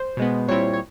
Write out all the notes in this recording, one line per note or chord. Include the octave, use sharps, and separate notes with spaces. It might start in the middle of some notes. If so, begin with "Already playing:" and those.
Already playing: C5
B2 G#3 B3
A#2 G3 C4 E4 C#5
C#5